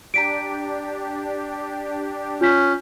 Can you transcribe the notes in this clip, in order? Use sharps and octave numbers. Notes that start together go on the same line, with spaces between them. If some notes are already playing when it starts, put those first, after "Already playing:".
D4 G4 A#5 B6 D7
C#4 F4 G6 B6